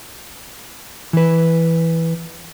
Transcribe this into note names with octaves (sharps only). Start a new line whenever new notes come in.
E3 B4